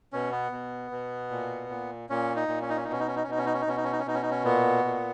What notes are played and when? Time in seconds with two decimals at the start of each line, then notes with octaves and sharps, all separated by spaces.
0.13 B2 C#4
0.32 B3
0.52 B2
0.91 B2
1.31 A#2
1.69 A#2
2.10 A#2 C#4
2.36 D#4
2.48 A#2
2.62 C#4
2.69 D#4
2.76 C#4
2.85 D#4
2.87 B2 C#4
3.00 D#4
3.08 C#4
3.16 D#4
3.23 C#4
3.27 B2 D#4
3.38 C#4
3.46 D#4
3.54 C#4
3.61 D#4
3.67 B2 C#4
3.77 D#4
3.84 C#4
3.92 D#4
3.99 C#4
4.06 B2 D#4
4.14 C#4
4.22 D#4
4.30 C#4
4.44 A#2 B3
4.85 A#2